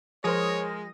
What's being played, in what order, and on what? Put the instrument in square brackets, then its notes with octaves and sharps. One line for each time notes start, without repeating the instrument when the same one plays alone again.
[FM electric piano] F3 D#6 A#6 [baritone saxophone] G#3 [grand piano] G#4 A#4 C5 [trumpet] C#5